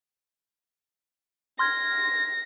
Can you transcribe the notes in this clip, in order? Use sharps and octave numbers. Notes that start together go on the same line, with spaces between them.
C6 F6 G#6 A#6